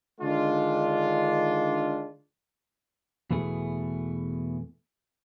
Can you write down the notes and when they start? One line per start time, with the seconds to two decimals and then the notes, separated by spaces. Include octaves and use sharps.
0.21 D3 D#3 G#3 D4 F4
3.31 E2 B2 E3 A3 G#4